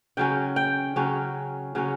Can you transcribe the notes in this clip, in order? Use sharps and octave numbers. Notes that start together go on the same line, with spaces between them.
C#3 F#3 C#4 G5
G5
C#3 F#3 C#4
C#3 F#3 C#4